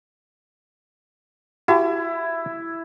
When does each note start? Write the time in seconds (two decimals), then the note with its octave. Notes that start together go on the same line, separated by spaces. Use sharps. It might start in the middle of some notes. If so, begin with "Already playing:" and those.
1.68 E4 F#4 G4 A5